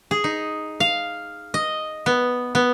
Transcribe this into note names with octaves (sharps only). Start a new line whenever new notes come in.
G#4
D#4
F5
D#5
B3
B3